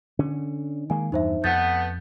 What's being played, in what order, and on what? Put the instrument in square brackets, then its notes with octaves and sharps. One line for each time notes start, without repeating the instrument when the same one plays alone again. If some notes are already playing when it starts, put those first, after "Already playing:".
[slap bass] D3 C#4
[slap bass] D#3 G#3 A#3 [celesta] G#5
[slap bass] E2 G2 [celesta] D#4 C5 E5
[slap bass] F2 [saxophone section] A3 B3 [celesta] G6 A6